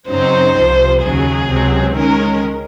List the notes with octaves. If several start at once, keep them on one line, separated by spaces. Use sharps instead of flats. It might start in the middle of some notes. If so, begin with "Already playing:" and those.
F#2 C#3 F#3 C4 D#4 C5
C2 C3 F3
D#2 C#3 F#3 G#4
C#2 C3 F#3 C4
D#3 G#3 C#4 A#4